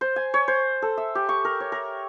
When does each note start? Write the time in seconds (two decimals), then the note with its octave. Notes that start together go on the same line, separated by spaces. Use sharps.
0.01 C5
0.16 G#5
0.34 C#5
0.48 C5
0.82 A4
0.97 E5
1.15 G4
1.29 C#6
1.45 A#4
1.60 C#5
1.72 A#4